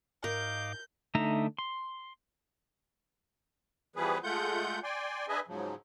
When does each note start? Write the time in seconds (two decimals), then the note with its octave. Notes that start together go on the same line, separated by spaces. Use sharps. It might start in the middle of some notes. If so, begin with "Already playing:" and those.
0.24 G#2 A#4 D#5 F5 D6 G6
1.15 D3 A3 D#4 E5 A#5
1.59 C6
3.96 E3 F3 G3 B3 G#4 B4
4.24 G#3 A3 F4 F#5 G6
4.83 D5 G5 G#5 C6
5.28 D4 G#4 B4 D#5 E5 G#5
5.47 G#2 C#3 F3 F#3